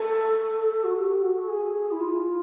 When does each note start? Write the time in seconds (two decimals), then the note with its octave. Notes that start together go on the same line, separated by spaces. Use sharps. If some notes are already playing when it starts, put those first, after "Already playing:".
Already playing: A4
0.83 F#4
0.96 G4
1.21 F#4
1.38 A4
1.48 G#4
1.91 E4
2.00 F4